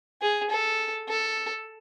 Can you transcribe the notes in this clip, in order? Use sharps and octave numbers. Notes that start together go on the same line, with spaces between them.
G#4
A4
A4